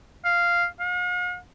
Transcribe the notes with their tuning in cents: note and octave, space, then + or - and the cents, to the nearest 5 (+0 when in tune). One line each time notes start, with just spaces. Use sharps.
F5 -5
F5 +45